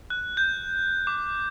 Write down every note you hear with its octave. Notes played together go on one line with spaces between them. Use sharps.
F#6
G6
D6